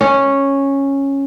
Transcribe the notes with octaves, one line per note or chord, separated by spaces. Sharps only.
C#4